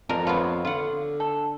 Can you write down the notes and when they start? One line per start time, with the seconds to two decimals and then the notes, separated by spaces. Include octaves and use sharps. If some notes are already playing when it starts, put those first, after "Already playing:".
0.09 F2 D3 D4 A#4
0.27 B3 C4 F4 C#5
0.65 D3 F4 F#5
1.20 A4